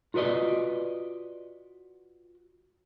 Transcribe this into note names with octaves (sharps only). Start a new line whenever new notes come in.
F4 F#4 B4 D5 D#5